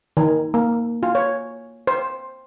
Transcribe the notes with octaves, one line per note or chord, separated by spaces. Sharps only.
D#3
A#3
F4
C#5
C5